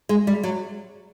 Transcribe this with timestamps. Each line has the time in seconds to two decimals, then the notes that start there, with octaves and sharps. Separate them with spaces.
0.09 G#3
0.27 G3
0.44 F#3